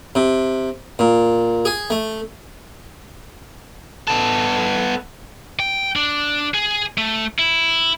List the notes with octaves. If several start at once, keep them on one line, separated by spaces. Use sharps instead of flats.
C3
A#2
G#4
A3
B3 A4
G5
D4
G#4
A3
E4